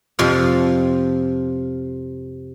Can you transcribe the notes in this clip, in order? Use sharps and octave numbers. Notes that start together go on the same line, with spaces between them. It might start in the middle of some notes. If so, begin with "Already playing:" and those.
F2 C3 F3 C5 F5